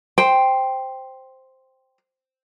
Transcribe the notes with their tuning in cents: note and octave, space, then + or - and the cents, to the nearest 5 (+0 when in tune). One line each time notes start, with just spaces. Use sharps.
C5 +0 G5 +0